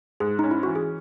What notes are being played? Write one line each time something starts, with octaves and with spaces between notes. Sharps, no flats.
G#2 G#4
C#4 D#4
E4
E3 F#4
G#4